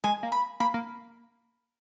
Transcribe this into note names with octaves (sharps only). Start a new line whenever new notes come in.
G#3 G#5
A#3
B5
A#3 B5
A#3